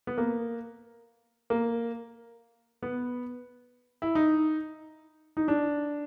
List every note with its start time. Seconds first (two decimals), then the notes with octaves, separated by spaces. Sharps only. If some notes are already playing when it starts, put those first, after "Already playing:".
0.07 B3
0.18 A#3
1.50 A#3
2.82 B3
4.02 E4
4.15 D#4
5.37 D#4
5.48 D4